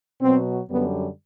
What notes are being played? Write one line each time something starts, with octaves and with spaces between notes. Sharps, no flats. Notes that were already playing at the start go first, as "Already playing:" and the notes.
B2 F#3 C4
F#2 D3 G3 B3